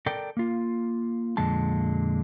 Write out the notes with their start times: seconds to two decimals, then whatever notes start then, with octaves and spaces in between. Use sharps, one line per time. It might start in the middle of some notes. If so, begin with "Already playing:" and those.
0.06 A4 A#4 D5 G5
0.37 A#3 F4
1.37 F2 A#2 D3 G#3 A5